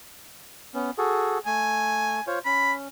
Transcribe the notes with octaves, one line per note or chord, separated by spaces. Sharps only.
B3 C#4
F#4 G#4 A4
A3 G#5
F4 C5 C#5
C#4 B5